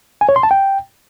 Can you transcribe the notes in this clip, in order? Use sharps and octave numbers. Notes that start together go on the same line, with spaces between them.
G#5
C#5
C6
A5
G5